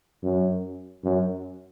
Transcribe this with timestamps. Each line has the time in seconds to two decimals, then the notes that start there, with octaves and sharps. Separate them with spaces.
0.22 F#2
1.04 F#2